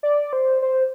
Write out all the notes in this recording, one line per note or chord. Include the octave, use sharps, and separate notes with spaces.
D5
C5
C5